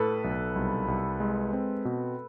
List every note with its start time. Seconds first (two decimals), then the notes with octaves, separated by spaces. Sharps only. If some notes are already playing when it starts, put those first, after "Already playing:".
Already playing: A2 A4 B4
0.24 B1
0.56 C2
0.88 C2
1.20 G#3
1.53 C4
1.85 B2